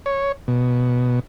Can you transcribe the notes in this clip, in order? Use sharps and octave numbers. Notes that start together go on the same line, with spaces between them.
C#5
B2